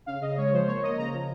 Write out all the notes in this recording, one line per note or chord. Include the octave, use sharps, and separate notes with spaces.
C#3 F5
C#3 D#5
G#3 C#5
F3 C5
A#3 C#5
A#3 D#5
C#3 A#5
F3